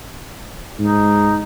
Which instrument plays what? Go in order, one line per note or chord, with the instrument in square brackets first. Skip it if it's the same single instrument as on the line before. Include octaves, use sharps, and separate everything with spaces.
[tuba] G#2 [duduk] D#4